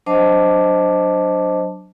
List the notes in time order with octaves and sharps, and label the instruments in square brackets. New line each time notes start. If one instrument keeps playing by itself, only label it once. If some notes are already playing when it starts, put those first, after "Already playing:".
[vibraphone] F#3 D4 C5 D#5 A5 D6